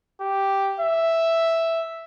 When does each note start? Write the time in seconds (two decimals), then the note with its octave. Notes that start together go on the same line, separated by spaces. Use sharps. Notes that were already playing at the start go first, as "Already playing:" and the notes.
0.21 G4
0.80 E5